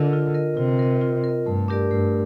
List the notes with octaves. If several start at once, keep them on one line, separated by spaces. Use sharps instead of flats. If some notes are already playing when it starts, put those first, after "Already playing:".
Already playing: D3 F4 A#4 D#5
F4
A#4 D#5
C3 F4
A#4 D#5
F4
A#4
D#5
G2 A3
D4 G4 A#4 D5
G2 A3